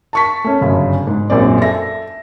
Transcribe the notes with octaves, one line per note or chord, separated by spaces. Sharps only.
A5 C#6 B6
A3 C#4
G1 F#2 C#3
G#2
A#1 F#2 A#2 C4 D5
A4 E5 A#6